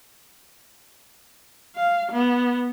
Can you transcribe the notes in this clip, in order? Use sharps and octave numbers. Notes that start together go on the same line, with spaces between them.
F5
B3